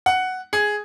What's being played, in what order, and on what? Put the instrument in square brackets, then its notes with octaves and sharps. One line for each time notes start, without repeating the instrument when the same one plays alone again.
[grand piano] F#5
G#4